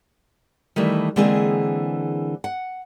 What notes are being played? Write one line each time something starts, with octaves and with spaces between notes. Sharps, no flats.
D#3 E3 G3 A3
D3 E3 G#3 A#3 C4 G#4
F#5